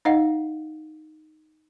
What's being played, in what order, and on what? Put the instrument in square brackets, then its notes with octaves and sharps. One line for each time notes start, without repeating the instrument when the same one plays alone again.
[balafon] D#4 D#5 F5 F#5